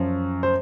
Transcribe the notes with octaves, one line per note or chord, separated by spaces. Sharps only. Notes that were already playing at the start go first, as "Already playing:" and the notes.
Already playing: F#2 F3
C5